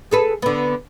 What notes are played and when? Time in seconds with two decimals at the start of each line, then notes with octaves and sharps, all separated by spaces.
0.11 G#4 A4 B4
0.42 D3 B3